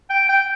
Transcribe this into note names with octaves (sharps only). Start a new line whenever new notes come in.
G5
G5